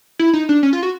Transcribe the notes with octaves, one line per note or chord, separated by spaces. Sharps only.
E4
D#4
D4
C#4
F4
F#4